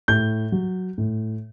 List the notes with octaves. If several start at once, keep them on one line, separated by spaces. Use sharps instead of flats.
A2 G6
F#3
A2